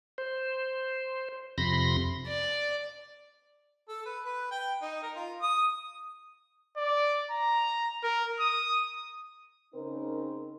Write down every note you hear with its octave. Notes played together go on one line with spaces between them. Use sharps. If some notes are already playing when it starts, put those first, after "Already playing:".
C5
F2 C3 B5 C6 A#6
D5
A4
B4
B4
G5
D#4
A#4
F4
D#6
D5
A#5
A#4
D#6
C#3 C4 D#4 A#4